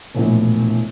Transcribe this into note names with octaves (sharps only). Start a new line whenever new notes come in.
E1 A#1 A2